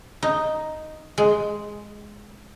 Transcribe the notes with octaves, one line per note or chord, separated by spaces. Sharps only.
D#4
G#3